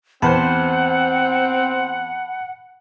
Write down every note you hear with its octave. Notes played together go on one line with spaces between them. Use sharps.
E2 C4 B4 C5 F#5 A5 B5